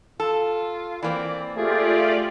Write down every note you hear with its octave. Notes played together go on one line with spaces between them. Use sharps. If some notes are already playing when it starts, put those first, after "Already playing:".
F4 A4
E3 A#3 C4 D5
A3 F4 G4 G#4 D5